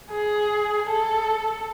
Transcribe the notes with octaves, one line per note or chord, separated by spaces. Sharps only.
G#4
A4